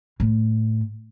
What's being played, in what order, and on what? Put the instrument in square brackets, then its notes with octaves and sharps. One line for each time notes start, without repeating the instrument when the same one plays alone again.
[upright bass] A2